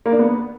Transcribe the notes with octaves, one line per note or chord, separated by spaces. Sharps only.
A#3
D4
B3